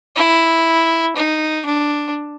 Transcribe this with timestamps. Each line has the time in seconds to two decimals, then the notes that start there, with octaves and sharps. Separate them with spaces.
0.16 E4
1.16 D#4
1.65 D4